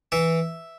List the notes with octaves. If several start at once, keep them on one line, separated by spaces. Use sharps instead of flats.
E3 E5